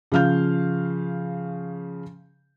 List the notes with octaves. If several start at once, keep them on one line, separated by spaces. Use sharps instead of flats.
C#3 F3 F5 F6 G6